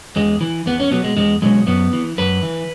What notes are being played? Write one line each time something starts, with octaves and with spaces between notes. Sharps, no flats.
E2 G#3
E3
E2 B3
C#4
B2 F#3 B3
G#3
E2 G#3
B2 F#3 G#3
F#2 B3
E3
F#2 B4
E3